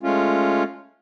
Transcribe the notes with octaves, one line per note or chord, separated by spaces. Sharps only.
G#3 A3 C#4 F4